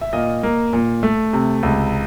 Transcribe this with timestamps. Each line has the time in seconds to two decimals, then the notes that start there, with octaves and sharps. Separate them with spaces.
0.01 E5
0.13 A#2 D#5 F5
0.43 A#3
0.73 A#2
1.03 A3
1.33 C3
1.63 C#2